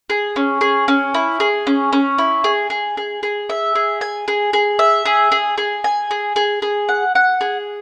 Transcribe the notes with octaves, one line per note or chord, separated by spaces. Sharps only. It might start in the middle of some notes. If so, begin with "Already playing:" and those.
G#4
C#4
G#4
C#4
E4
G#4
C#4
C#4
E4
G#4
G#4
G#4
G#4
E5
G#4
G#5
G#4
G#4
E5
G#4
G#4
G#4
G#5
G#4
G#4
G#4
F#5
F#5
G#4